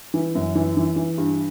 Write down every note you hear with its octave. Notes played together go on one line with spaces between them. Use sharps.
E3
F#2
E3
E3
E3
G2